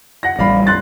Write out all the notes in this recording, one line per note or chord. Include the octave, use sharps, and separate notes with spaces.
F#5 A#6
A1 G3 D5 F5 B5
C6 F#6 A6